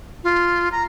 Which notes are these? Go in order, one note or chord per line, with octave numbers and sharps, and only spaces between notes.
F4
A#5